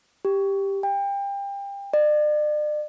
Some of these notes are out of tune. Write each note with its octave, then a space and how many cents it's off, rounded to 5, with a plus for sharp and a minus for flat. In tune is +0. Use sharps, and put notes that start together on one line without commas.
G4 +5
G5 +30
D5 +40